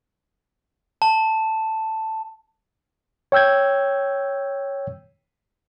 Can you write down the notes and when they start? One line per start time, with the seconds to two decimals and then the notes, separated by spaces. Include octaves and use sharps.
1.02 A5
3.32 C#5 G5 E6 G6 G#6